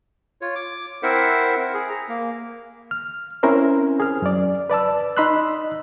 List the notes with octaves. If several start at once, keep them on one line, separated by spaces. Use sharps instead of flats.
F4 C#5
D6
C4 E4 A#4 C5 E5 F#5
G#4
A#5
A#3
F6
C4 C#4 E4 A#4 C5
G#4 F6
F#2 D5
B4 D5 A5 E6
D#4 D#5 B5 C6 E6 F#6